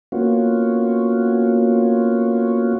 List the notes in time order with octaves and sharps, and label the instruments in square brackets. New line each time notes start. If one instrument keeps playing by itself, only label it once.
[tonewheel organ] A#3 B3 C#4 F4 F#4